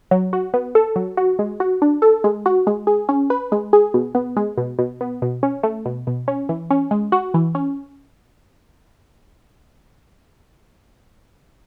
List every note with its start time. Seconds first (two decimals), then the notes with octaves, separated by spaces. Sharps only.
0.11 F#3
0.33 F#4
0.54 B3
0.75 A4
0.96 F#3
1.17 F#4
1.39 G#3
1.60 F#4
1.82 D4
2.02 A4
2.24 G#3
2.46 F#4
2.67 G#3
2.87 G#4
3.09 C#4
3.30 B4
3.52 G#3
3.73 G#4
3.94 B2
4.15 B3
4.37 G#3
4.58 B2
4.79 B2
5.01 B3
5.22 B2
5.43 C#4
5.63 A3
5.86 B2
6.07 B2
6.28 C#4
6.49 E3
6.71 C#4
6.91 G#3
7.12 F#4
7.34 E3
7.55 C#4